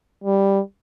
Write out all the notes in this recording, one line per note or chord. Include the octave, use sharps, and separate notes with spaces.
G3